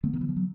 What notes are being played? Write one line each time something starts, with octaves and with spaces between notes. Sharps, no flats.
D3 A3 B3
D#3
E3
F3
F#3